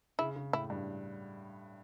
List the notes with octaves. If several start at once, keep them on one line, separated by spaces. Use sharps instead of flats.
C#3 E4
C#3
A2 E4
G2